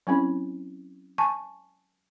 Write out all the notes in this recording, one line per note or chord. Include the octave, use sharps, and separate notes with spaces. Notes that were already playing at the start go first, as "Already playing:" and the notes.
F#3 C4 C#4 E4
G#5 A5 C#6